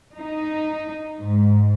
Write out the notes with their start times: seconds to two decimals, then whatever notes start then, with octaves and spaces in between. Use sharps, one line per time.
0.16 D#4
1.19 G#2